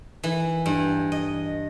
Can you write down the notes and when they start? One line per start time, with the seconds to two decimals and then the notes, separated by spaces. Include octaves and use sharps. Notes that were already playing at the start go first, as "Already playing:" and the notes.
0.23 E3
0.66 G2
1.12 D#5